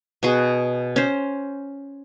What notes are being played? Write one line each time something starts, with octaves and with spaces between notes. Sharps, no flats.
B2 B3 F#4 G#4
C#4 C5